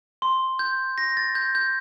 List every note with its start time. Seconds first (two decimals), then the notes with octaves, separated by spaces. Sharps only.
0.22 C6
0.59 G6
0.98 A#6
1.17 A6
1.35 G6
1.55 G6